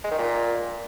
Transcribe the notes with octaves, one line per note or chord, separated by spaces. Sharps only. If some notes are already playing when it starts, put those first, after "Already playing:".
G#3
D#3
A#2